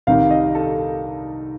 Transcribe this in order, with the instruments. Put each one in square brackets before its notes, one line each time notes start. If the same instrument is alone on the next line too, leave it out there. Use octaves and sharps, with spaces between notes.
[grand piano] C2 C3 D#3 F5
D#5
A4